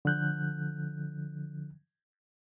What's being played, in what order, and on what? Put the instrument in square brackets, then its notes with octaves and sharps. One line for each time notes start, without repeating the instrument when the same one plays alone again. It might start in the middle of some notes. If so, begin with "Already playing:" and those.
[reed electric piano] D3 F3 F#6 G6